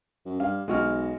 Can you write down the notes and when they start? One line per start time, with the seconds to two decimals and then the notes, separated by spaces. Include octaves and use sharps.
0.26 F#2
0.40 G2 F5
0.68 B1 G#3 F#4 F6